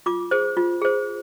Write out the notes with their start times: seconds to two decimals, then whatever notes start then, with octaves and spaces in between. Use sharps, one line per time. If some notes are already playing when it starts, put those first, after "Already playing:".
0.06 F4 D6
0.31 G#4 C5
0.57 F4
0.81 G#4 C5